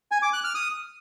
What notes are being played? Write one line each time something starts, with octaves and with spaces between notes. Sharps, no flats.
G#5
D6
F#6
F6
D#6